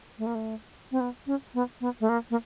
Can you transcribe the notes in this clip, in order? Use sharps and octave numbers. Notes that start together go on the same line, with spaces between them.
A3
A#3
A3
C4
B3
C#4
B3
B3
A3
A#3
A#3